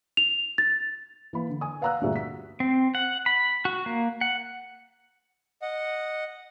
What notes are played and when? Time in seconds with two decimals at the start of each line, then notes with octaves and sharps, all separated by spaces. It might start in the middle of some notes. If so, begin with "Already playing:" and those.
0.17 F7
0.58 A6
1.33 E3 A#3 B5
1.49 D3
1.61 G#5 D#6
1.81 B4 F5 F#5 A#5 E6 F#6
2.01 D2 G2 A#2 F#4 G#4 E5
2.16 B6
2.60 C4
2.95 F#5
3.26 B5
3.65 F#4
3.86 A#3
4.21 F#5
5.62 D#5 F#5